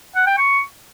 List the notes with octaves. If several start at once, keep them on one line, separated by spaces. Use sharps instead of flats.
F#5
G5
C#6